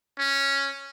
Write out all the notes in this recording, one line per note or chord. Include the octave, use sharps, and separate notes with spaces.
C#4